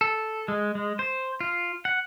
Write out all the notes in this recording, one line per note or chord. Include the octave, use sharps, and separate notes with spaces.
A4
G#3
G#3
C5
F4
F#5